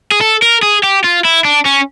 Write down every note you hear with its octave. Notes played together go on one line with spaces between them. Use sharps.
G#4
A4
A#4
G#4
G4
F4
E4
D4
C#4